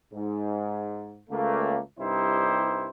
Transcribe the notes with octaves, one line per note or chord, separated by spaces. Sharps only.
G#2
C#2 A3 A#3
C2 G2 D#4 E4 G4 C5